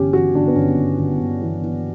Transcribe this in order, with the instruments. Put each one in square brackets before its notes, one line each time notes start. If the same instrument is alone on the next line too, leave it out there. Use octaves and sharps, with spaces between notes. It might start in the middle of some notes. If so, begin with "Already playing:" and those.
Already playing: [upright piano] G1 E3 C#4 G4
E3 F#4
G1 D4
B3
G1 C#4
G1
G1
G1
E3
E3